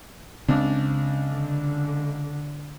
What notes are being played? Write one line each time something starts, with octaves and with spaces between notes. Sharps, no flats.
C#2 C#3 C4 D4
D3